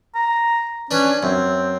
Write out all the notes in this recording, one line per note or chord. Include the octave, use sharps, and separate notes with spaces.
A#5
C#4 D4 B4
F#2 C4